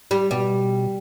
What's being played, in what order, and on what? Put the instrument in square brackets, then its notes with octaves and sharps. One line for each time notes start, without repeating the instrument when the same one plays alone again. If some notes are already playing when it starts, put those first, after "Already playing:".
[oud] G3
[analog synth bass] B2 [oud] G3